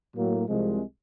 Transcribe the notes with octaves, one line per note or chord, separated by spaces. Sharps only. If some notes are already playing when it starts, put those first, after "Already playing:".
A2 F#3 A#3
C2 C3 F3 G#3